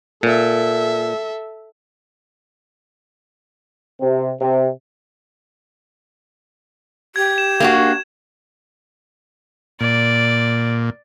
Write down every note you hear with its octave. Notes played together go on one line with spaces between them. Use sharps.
A#2 A4 E5
C3
C3
G4 G#6
E7
A#3 D4 F#4
A#2 D5